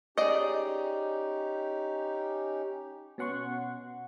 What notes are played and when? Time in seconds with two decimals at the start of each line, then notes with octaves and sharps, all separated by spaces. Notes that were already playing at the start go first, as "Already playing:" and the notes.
0.18 C#4 D#4 G4 G#4 D5 D#5
3.18 B2 C#4 F#5 C6 C#6